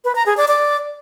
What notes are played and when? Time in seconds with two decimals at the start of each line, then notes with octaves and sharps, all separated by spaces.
0.05 B4
0.15 A#5
0.26 G#4
0.37 D5
0.48 D5